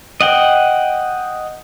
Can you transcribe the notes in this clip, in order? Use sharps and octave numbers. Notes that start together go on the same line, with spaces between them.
D#5 F#5 G5